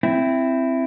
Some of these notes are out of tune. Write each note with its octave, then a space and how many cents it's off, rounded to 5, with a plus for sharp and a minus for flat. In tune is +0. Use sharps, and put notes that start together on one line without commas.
C4 +0 E4 +10